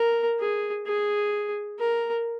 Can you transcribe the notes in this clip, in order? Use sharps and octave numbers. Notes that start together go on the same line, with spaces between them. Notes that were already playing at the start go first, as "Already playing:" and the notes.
Already playing: A#4
G#4
G#4
A#4